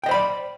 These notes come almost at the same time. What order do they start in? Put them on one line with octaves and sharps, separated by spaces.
G5 D#5 C5 B5 D5